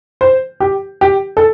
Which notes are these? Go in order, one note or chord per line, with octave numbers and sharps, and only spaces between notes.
C5
G4
G4
A4